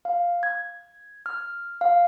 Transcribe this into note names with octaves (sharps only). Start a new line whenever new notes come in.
F5
G#6
F6
F5